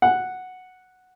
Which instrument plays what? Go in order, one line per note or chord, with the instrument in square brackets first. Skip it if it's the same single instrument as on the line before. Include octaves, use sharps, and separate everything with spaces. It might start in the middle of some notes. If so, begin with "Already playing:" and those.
[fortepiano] F#5